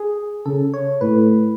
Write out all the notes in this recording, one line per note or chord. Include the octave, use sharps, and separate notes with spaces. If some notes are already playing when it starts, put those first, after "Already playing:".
Already playing: G#4
C#3 A4
C#5
A2 B4